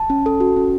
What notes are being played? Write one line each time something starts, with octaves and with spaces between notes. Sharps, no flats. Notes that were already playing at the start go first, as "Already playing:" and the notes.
Already playing: A5
C#4
A4
F#4
C#4